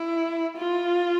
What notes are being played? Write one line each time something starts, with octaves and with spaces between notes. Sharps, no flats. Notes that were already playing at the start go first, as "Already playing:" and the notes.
Already playing: E4
F4